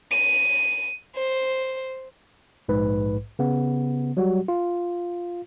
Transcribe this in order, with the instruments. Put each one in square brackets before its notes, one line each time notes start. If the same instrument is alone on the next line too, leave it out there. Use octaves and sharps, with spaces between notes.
[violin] D#7
C5
[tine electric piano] A#1 G#2 B4
C#3 B3
F#3 G3 F#4
F4